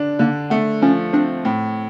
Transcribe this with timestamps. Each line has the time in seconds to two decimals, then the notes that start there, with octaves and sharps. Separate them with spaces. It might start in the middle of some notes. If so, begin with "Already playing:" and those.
Already playing: D3 D4
0.19 D3 A#3
0.50 A3 B3
0.82 F3 C#4
1.13 C4 D4
1.45 A2